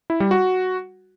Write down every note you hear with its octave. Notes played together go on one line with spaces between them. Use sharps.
E4
G3
F#4